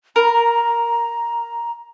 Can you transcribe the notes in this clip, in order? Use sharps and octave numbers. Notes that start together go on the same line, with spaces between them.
A#4 A#5